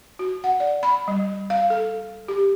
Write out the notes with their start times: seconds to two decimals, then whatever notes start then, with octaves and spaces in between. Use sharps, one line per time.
0.19 F#4
0.44 F#5
0.60 D5
0.83 B5
1.08 G3
1.50 F5
1.70 A4
2.28 G4